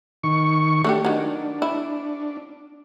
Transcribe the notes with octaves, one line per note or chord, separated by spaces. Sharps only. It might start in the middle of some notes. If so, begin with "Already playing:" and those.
D#3 C#6
A3 D4 G4
D#3 F#3 D4
E4